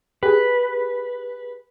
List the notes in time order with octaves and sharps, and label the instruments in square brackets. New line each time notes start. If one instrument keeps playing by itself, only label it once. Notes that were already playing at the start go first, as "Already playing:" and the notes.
[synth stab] G4 G#4 [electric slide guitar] B4